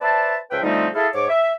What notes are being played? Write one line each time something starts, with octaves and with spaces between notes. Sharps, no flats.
B4 C5 D5 E5 A5
C#2 F3 B4 C5 E5 G5
D3 F3 G3 A3 C4 D#4
E4 G#4 A4 F5
G#2 C#5 D6
E5